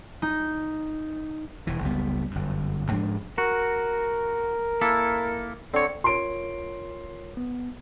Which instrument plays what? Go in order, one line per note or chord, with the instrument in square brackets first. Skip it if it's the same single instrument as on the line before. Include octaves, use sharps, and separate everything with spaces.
[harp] D#4
[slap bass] E1 E3
F#1 C#2 G3 B3
G1 F#2
G#2 F3 G#3 D4
[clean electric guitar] F#4 [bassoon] A#4
[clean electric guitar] A#3 E4 A4
[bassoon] D3 [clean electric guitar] C4 C#5
[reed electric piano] F4 A#4 C#5 [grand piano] C6 D7
[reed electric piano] B3